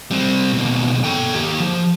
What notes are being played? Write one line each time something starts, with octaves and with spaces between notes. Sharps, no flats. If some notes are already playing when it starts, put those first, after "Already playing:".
G3 C4
D#2 B2
A4 G5
D#2 G4
F3